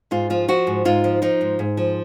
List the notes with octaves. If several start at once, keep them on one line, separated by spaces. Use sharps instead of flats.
G#2 F4
F3 F4
F3 F#4
G#2
G#2 F4
F3
F3 D#4
G#2
G#2
F3